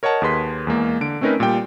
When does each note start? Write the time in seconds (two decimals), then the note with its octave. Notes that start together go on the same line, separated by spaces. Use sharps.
0.03 A#4 C#5 D#5 F#5 A5
0.22 D#2 G#4 B4 C6 B6
0.67 E2 G#3 A#3
1.01 D3 D7
1.21 A3 C4 C#4 D#4 A#4 B4
1.40 A#2 G3 G5